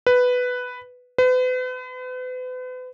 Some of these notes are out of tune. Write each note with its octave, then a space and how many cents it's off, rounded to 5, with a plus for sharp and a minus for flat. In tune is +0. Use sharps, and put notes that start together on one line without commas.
B4 +5
B4 +40